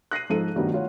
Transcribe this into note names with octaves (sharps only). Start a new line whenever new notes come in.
F#6 A#6 C7 D#7
G#2 F3 D#4 A4 D#7
G2 D#3 F#3 G3 A3 B3
A3 F4 C#5 F#5